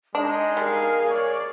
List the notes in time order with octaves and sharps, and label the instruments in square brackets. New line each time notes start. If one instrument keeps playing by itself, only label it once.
[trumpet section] G#3 D#4 [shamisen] D4 [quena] D#5
[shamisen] G3 [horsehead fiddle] G#4 F5 [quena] A#4
[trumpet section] C#5 [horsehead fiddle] D5